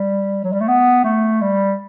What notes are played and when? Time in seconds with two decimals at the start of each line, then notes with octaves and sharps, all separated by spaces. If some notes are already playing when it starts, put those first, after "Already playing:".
Already playing: G3
0.44 F#3
0.52 G3
0.60 A3
0.68 B3
1.04 A3
1.41 G3